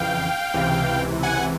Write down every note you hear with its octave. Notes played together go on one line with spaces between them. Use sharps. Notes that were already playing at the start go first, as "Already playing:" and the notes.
Already playing: F2 C#3 E3 F5 G5
C#2 C3 E3
F#5 G#5